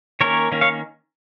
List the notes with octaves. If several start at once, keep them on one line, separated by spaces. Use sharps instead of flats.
D#3 A#3 C#4 A#4 C#5
D#3 A#3 C#4
C#5 F5